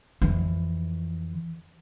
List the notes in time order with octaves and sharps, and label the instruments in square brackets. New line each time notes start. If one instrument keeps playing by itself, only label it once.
[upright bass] F2 E3